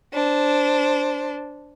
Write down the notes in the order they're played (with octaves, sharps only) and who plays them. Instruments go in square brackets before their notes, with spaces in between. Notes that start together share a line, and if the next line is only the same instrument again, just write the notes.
[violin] D4 C5